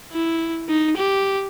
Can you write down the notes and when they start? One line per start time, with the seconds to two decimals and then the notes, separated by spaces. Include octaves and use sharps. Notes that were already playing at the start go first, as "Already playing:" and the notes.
0.12 E4
0.69 D#4
0.97 G4